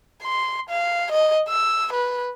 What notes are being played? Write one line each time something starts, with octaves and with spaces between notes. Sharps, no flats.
C6
F5
D#5
E6
B4